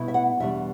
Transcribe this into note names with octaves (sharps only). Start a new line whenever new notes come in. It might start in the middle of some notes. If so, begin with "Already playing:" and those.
Already playing: B2 A3 E4
E5
F#5
E2 B2 G3 D4 E5